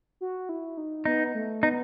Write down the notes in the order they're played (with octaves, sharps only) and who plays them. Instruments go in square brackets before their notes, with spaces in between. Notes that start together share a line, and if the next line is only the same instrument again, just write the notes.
[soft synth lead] F#4
E4
D#4
[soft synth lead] B3 [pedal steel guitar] D#4
[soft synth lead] A3
[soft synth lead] B3 [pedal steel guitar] D#4